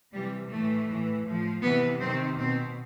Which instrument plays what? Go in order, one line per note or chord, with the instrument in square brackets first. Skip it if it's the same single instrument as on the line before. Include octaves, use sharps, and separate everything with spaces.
[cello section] C3 E3 G3
A2 E3 A3
A2 E3
A2 F3
C3 E3 B3
C3 D#3 C4
B2 C4